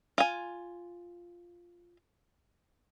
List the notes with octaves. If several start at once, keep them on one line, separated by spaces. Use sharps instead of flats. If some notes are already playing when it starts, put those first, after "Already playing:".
F4 G#5